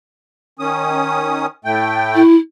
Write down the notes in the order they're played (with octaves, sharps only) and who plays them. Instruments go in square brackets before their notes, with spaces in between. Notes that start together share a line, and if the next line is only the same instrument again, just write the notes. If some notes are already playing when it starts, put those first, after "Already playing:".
[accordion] D#3 C#4 D#6
A2 A3 G5
[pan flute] E4